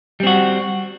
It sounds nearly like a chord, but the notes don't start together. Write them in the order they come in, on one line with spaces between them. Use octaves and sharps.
G3 C4 F#4